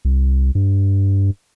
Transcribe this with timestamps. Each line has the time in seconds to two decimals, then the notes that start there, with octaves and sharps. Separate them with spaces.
0.05 C2
0.55 G2